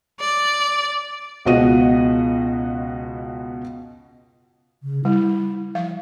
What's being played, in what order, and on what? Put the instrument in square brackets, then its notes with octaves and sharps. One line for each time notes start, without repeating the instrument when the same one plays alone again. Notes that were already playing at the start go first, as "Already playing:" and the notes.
[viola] D5
[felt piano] C#2 B2 F#4 D#5 D#7
[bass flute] C#3
[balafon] G3 [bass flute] E4
[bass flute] F3 [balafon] F5